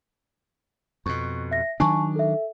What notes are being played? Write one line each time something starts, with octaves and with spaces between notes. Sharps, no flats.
F2 B2 C#6
E5 A#6
D#3 F#3 D4 G#5 A5 C#6
A4 E5